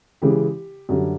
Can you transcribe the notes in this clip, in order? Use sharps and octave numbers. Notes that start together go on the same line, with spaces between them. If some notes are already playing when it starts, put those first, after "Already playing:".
C#3 E3 G#3 G4
F#2 D3 G3